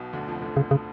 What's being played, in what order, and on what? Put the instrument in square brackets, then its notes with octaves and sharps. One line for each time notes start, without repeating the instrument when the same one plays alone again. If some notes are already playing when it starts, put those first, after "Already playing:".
Already playing: [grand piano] B1 B2
D2 D3
F2 F3
D2 D3
[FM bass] C#3
C#3